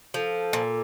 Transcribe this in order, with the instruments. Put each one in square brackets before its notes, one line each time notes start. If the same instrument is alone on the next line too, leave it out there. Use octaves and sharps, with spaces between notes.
[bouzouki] F3 [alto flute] A4
[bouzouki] A#2